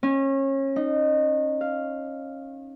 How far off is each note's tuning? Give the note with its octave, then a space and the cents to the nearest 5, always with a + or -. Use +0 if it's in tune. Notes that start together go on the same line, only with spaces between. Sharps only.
C#4 -30
D#4 -25
F5 -5